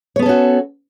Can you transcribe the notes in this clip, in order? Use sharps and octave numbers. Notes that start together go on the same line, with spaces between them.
B3 C#4 F#4 A4 C#5